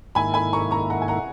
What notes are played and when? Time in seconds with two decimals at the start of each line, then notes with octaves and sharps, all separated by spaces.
0.15 G#2 D#3 A#3 E4 G#5 B5
0.34 G#5 B5
0.53 A#5 C#6
0.71 A#5 C#6
0.90 F#5 A#5
1.02 G#5
1.08 F#5 A#5